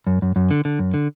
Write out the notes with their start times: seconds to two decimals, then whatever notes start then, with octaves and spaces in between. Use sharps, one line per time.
0.07 F#2
0.22 F#2
0.36 F#2
0.51 D3
0.65 D3
0.79 F#2
0.94 D3